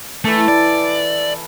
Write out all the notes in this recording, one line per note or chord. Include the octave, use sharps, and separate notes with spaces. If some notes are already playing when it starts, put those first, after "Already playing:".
E3 A3 A4 A5
D5